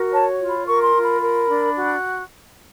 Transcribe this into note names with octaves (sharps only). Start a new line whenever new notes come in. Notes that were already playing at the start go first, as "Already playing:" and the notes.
Already playing: F#4 A#4
C#5 A5
F4
B5
A#4 C#6
C6
F4
B5
A#4
D4
F#4